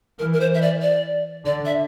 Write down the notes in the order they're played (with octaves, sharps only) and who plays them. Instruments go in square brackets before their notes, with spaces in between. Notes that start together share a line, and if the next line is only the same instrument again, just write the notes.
[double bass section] E3 [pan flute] A#4
[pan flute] A#4
C5
E5
D5
D5
[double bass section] D3 [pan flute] D5
[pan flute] E5